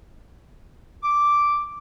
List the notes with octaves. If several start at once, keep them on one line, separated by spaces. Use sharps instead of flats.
D6